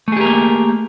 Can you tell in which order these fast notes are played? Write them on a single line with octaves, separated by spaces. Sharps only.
A3 G#4 G4 A#4 A#3